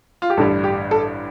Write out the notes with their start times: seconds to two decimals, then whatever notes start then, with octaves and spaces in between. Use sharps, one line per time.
0.22 F4
0.30 G4
0.37 A1 G2 D3 G3 A4
0.64 G4
0.91 A4